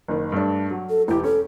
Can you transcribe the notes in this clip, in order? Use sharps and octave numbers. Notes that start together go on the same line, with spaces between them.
F#1 D#3
G2 A3 D4
F#3
A4
E1 E4 G4
C#4 A4